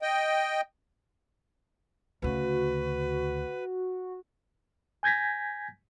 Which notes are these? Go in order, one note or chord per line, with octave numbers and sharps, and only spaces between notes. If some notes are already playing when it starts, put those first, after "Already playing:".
D#5 G5
D2 C#3 F#4 B4
G#5 G6 G#6 A#6 B6